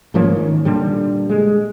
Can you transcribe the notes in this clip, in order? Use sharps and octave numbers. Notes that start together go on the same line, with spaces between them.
G#2 F3 A#3 C#4
D#3
A#2 D3 G3
G#3